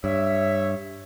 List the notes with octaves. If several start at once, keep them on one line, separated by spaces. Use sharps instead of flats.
G2 C#5 E5